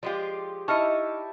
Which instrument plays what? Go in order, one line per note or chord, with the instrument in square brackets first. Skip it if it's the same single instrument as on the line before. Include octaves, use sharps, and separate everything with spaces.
[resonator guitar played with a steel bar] F3 G#3 F4 [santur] G4 D5
[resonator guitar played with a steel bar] D#4 D#5 [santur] E4 E5 A5 [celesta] C#6 F6 C#7